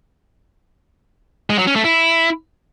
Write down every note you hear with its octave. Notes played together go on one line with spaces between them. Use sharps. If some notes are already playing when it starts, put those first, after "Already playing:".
G#3
F#3
C#4
A3
E4